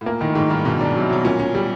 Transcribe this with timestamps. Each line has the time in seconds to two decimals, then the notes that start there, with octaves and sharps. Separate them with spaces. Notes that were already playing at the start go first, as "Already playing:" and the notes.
0.01 A2
0.06 A#2 A#3
0.20 A2 D#3
0.32 A2
0.35 G#2 D#3
0.50 G2 D#3
0.65 G#2 B2
0.81 D4
0.95 C3 F#3
1.10 B2 F#3
1.25 A#2 C#4
1.40 C#4
1.55 G3